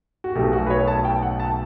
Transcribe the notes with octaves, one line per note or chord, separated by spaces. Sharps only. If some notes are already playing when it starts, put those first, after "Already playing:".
F#4
B1 B2 A3 G4
F#4
B4
C#5
A5
G5
F#5
A5